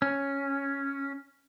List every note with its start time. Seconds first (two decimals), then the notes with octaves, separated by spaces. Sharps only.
0.02 C#4